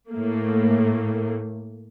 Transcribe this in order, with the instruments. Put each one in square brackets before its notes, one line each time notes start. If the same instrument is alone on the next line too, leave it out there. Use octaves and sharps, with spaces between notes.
[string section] A2 A3 A#3